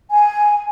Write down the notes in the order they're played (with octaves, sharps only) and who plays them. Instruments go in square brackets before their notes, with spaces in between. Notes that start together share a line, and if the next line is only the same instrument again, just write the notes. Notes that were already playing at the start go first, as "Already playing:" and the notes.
[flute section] G#5